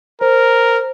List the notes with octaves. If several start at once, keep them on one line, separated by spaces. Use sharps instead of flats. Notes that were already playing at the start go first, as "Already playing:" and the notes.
A#4 C5